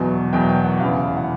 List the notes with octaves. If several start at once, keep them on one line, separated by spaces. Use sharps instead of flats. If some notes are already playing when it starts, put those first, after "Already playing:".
Already playing: E2 B2 F#3
E2 B2 F#3 G5
G5
F#5
F1 E2 C#3 E3 F5
F#5